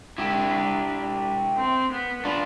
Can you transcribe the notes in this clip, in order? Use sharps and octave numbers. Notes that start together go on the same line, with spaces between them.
D4 E4 G4
C4
B3
D4 F4